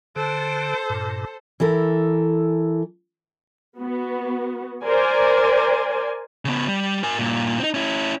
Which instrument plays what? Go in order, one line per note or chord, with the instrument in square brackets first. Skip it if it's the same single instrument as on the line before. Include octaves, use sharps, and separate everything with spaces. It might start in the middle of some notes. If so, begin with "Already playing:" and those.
[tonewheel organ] D3 [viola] A4 C5
[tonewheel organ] G2 A#2
[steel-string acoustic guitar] E3 E4 A4 A#4
[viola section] B3 F#4
A#4 C5 D5 G#5
[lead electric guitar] C#3 B3
G3
A#4 G#5
G2 A#2
C4 D#4
C#4 E4